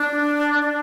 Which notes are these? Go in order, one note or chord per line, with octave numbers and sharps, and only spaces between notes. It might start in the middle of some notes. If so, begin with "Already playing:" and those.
Already playing: D4
D4